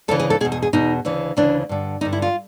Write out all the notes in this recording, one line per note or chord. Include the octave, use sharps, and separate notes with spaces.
D2 C#3 E3 A4
G#4
A4
E2 B2 G#4
G#4
G#4
E2 B2 D#4
D2 C#3 E3
D2 C#3 E3 D4
G2 D3
G2 D3 D#4
E4
F4